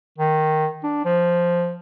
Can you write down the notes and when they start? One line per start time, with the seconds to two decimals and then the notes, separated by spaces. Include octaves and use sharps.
0.18 D#3
0.84 D4
1.05 F3